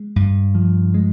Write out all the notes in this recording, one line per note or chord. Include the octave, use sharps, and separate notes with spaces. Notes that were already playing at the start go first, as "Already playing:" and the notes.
Already playing: G#3
G2
F3
G#3